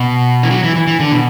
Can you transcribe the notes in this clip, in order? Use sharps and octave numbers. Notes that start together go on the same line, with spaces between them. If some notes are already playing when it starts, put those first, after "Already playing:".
Already playing: B2
E3
F#3
E3
E3
E3
D3
B2